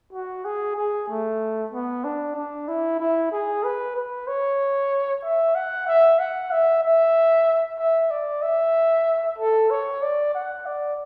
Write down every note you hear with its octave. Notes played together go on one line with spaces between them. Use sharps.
F#4
G#4
G#4
A3
B3
D4
D4
E4
E4
G#4
B4
B4
C#5
E5
F#5
E5
F#5
E5
E5
E5
D5
E5
A4
C#5
D5
F#5
D5